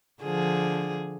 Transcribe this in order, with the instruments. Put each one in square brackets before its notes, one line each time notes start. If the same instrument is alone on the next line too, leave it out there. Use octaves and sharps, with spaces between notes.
[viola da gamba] D3 F3 G#4